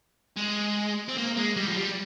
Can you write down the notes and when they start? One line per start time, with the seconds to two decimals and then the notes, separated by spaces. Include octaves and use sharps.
0.37 G#3
1.09 C4
1.17 A#3
1.37 G#3
1.56 G3
1.67 F3
1.76 G3